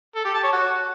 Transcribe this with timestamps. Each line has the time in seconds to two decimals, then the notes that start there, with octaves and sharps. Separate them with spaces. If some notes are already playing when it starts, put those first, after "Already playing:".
0.16 A4
0.25 G4
0.34 A5
0.43 C#5
0.53 F#4